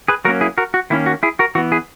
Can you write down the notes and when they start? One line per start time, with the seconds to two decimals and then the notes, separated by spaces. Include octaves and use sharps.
0.08 G#4 B4
0.25 F#3 A#3 C#4 F#4 A#4
0.41 E4 G#4
0.58 F#4 A#4
0.74 F#4
0.90 D#3 A#3 C#4 E4
1.06 F#4
1.23 E4 G#4
1.39 F#4 A#4
1.55 E3 F#4
1.58 B3
1.72 E4 G#4